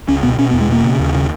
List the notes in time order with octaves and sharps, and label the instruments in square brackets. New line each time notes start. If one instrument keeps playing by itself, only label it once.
[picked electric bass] C#2 C#4
B2 B3
B2 C#4
B3
E2
G#3
B2 A#3
C#3
D#2
C#3